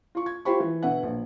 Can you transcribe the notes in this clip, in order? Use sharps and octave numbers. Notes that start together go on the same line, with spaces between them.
F4 C#6
G#6
F4 G4 C5 B5 C#6
E3
B2 D3 B4 E5 F#5
A#1